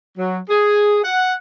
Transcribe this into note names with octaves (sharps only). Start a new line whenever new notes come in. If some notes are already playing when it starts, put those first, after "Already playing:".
F#3
G#4
F#5